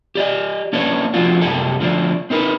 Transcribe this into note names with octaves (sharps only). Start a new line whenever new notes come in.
G4 D5 D#5
A#3 C#4 D4 A4 B4 C#5
F3 A3 C4 D4 F4 F#4
C2 F#2 A3 G4 A4
D3 F3 A3 B3 D4
C4 D#4 A#4 B4